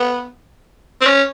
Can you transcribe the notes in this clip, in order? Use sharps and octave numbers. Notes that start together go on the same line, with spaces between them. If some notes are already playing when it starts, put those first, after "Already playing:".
Already playing: B3
C4
C#4